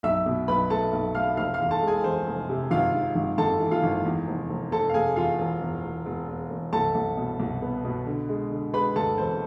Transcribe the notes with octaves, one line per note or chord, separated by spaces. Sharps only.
B1 E5 E6
B2
B1 B4 B5
A3 A4 A5
B1
A3 F5 F6
F1 F5 F6
F5 F6
E2
A4 A5
G#3
G#4 G#5
E2 C5
F1
C3
G#1 F4 F5
G#2
G#1
G#1 A4 A5
E3
F4 F5
G#1
E2
F1
F1
F1 A4 A5
F5
F1 G#4 G#5
E2 F4 F5
E1
E2
E1
E1
E1
E1
C2 A4 A5
C2
B2
C2
B3
B2
D3
G#3
D3
G#3 B4 B5
D2 A4 A5
E1 C5